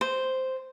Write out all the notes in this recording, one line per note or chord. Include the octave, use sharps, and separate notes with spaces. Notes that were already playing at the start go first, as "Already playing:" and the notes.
C5